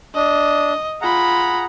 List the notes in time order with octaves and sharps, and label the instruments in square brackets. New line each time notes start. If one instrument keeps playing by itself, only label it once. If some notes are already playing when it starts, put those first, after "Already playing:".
[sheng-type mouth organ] D4 [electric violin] D#5
[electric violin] F4 B5 [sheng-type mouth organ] G#4 F#5 A#5